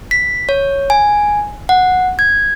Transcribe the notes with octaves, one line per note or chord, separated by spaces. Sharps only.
B6
C#5
G#5
F#5
G#6